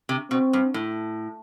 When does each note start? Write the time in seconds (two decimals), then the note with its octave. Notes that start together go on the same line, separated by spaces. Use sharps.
0.09 C3
0.31 B2 C4
0.53 G2
0.74 A2